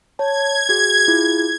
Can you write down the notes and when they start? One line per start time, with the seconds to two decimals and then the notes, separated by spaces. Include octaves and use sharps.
0.19 C#5 A5 G#6
0.69 F#4 G#4
1.08 E4 F4 G#4